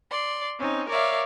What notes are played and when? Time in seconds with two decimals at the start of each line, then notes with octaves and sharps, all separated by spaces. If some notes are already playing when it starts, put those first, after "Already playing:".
0.10 D5 C6
0.59 C4 C#4 D#4
0.89 A#4 C#5 D5 E5 F5